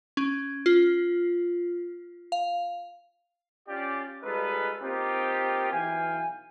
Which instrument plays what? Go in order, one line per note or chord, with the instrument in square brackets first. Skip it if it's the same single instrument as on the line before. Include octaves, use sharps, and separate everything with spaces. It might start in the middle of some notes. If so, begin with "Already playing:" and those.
[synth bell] C#4
F4
F5
[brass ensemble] C#4 F4 G4 D5
G3 G#3 D#4 F4 A4 B4
A#3 C4 D#4 F4 G4
B1 E3 F5 G5 G#5